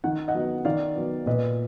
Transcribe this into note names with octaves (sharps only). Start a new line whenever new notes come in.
D#3 F#5
D#5 F#5
F#3 B3
D#3 D5 F5
F#3 B3
A#2 B4 D#5